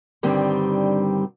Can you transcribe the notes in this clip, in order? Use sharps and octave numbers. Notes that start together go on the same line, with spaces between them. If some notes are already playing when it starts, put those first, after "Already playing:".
G2 D3 D#3 G3 C4